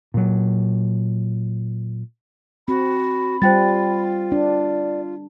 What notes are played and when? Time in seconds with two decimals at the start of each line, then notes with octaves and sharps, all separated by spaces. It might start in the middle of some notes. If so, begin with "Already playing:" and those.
0.14 A#2 F#3
2.68 C4 F#4 B5
3.42 G3 F4 C5 G5 A6
4.32 D4 D5